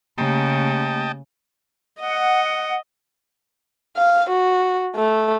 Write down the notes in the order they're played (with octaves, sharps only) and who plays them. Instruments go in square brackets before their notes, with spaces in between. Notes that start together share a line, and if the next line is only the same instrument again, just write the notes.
[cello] C#3 [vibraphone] A3 A#3 G4 [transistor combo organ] D#5 G5 A5
[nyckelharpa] D#5 [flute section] F#5
[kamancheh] F5
F#4
A3